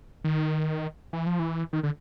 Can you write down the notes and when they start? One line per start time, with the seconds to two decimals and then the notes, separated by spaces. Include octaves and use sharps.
0.24 D#3
1.13 E3
1.26 F3
1.39 E3
1.73 D#3
1.83 D3